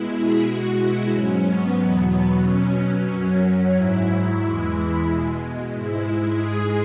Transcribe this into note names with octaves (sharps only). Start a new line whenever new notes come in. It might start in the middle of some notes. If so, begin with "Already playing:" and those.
Already playing: B2 G#3 E4
G#4
B2 G#3 F#4
E4
G#2 F#3 C#4
B3
E2 B2 F#3 B3
B2 F#3 C#4
F#2 F#3
G#2 F#3 E4
E2 E3 G#3
B2 G#3
G#2 G#3 E4
G#2 G#3 G#4